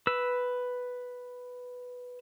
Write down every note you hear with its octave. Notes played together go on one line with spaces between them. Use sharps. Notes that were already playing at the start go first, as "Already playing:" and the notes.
B4 E6